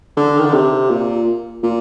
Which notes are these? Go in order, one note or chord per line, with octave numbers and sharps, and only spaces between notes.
D3
D#3
D3
C3
A#2
A#2